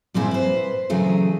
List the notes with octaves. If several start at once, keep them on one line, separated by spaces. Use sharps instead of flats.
A#2 G3 C4 E4 G#4
B4 C5
A#2 C#3 E3 F#3 A3 G#4